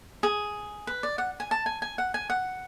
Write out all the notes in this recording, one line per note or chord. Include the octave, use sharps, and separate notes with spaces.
G#4
B4
D5
F#5
G#5
A5
G#5
G#5
F#5
G#5
F#5